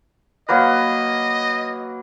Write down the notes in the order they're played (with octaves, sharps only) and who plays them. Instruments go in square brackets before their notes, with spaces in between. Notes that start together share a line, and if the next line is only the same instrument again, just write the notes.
[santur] F#3 A#3 B4 [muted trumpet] D#5